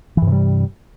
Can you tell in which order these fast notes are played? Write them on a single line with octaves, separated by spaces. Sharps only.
E3 G2 C3 G3